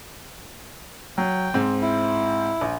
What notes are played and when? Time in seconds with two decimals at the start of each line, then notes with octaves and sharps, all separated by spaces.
1.18 F#3 G5
1.54 G#2 C4
1.82 E4
2.61 A#1